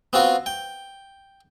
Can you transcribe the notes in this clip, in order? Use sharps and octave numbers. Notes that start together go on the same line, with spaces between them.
B3 C4 F4 F#4
G5